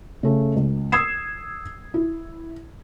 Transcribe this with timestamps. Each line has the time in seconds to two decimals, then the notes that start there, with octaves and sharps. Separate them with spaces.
0.23 C#3 A3
0.56 C#2
0.92 D#6 E6 G#6 C7 E7
1.94 E4